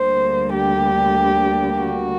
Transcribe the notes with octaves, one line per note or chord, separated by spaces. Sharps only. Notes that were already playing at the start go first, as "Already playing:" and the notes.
Already playing: D2 D3 G3 A#3 C5
G4
F#4